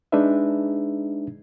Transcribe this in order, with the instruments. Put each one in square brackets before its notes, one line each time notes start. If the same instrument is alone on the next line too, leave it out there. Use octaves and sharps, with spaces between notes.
[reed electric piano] G#3 D4 D#4 G#4 B4 E5